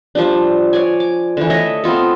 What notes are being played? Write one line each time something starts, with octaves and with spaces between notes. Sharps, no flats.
F3 G3 D4
C#5 D5 G#5
D6
D3 E3
A3 C#5 D#5 E5
B3 C4 F4 A4